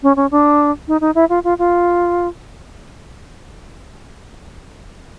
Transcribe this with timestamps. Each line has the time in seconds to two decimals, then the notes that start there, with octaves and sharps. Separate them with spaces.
0.03 C#4
0.16 C#4
0.31 D4
0.88 D#4
1.01 D#4
1.15 E4
1.29 F4
1.44 F4
1.59 F4